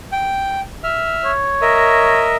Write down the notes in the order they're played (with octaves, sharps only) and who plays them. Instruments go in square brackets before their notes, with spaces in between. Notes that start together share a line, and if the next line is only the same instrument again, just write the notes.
[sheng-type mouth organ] G5
E5 F6
[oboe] C#5
[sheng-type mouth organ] A#4 D#5 E5